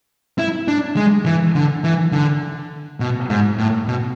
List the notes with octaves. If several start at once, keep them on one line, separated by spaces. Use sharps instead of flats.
E4
D4
G#3
E3
D3
E3
D3
B2
G#2
A2
B2